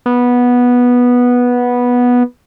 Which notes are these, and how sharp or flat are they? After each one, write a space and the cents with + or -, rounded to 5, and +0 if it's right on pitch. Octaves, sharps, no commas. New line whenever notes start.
B3 -10